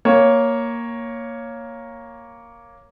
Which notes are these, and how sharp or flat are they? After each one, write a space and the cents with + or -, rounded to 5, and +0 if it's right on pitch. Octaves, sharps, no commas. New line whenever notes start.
A#3 +0 C#5 +0 G5 +0